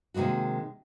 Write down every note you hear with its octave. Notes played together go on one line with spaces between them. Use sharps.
C3 D#3 G#3 A#3 F#4